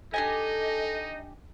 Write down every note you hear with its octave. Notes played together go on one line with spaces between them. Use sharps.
D4 D#4 G4 A4 D#5 G#5